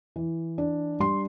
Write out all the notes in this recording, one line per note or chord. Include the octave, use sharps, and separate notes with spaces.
E3
D4
G3 C6